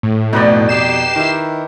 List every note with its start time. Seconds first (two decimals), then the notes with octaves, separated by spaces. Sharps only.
0.03 A2
0.33 F2 B2 D#4 B4 D5
0.69 G4 C7 E7
1.16 D#3 E4